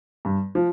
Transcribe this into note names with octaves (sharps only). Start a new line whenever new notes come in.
G2
F3